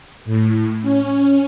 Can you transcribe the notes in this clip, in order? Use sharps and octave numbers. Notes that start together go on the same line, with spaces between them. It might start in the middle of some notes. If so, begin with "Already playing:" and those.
A2
C#4